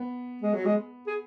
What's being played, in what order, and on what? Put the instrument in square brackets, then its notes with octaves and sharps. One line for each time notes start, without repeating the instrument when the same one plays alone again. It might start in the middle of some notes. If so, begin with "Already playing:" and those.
Already playing: [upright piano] B3
[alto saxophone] G#3
F#3
G#3
G#4